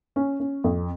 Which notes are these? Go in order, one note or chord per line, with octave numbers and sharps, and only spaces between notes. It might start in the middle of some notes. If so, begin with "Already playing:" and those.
C#4
C#4
F2